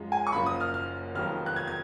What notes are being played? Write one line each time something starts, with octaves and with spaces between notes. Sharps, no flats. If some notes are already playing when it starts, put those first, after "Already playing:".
Already playing: F#2 F3 G#3
G#5
C#6
F#1 F#2 F3 A#3 B5
D#6
F6
F6
F1 F2 D#3 F#3 A#3 F6
F#6
G#6
G#6